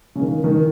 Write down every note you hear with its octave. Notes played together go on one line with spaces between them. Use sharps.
C#3
D#3
D#3